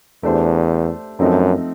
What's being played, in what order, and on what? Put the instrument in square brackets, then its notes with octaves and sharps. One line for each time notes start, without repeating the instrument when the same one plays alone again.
[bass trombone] E2 [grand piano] A3 D4 G4 C5
[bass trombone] F#2 [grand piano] F3 A3 C4 D#4